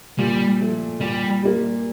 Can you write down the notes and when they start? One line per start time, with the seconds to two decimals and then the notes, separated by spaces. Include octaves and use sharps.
0.19 A#2 G3
0.60 F3 A3
1.00 A#2 G3
1.42 G3 A#3